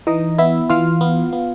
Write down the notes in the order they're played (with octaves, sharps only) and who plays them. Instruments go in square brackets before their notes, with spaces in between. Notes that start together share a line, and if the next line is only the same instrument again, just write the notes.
[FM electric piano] E3 D#4 D#5
B3 E4 E5
E3 F4 F5
B3
B3